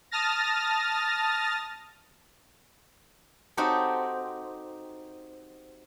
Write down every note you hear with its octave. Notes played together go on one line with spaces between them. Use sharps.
A5 D#6 F6 A6 A#6
C4 D#4 F#4 G4 A4